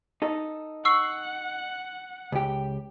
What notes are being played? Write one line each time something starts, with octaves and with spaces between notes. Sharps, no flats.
D#4 A4
F#5 C#6 E6 C7
C#2 G4